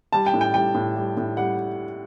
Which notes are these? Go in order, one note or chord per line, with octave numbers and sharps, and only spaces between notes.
G3 A5
G5
A2
G5
G3 G5
A2
G3
A2
G3 F#5